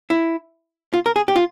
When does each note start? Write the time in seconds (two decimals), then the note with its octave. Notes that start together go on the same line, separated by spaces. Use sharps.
0.10 E4
0.94 F4
1.06 A#4
1.16 G#4
1.28 G4
1.36 F4